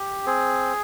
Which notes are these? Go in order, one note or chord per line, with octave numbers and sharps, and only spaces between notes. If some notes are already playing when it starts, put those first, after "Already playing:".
Already playing: G4
C4 G#4